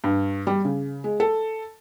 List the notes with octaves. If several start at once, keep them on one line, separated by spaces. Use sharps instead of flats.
G2
G3
C#3
G#3
A4